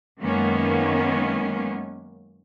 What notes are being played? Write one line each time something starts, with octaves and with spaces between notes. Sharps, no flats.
F#2 D#3 G#3 A#3 B3 C#4